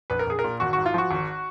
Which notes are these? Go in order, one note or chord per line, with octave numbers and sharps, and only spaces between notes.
A#1 B4
A#4
A#1 G#4
A#4
A#2
G#1 F#4
F#4
G#2
F4
F3 F#4
G#1